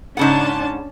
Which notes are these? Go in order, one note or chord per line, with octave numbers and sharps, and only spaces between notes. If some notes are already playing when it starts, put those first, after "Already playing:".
G#2 C#3 C#4 D4 F#5 A5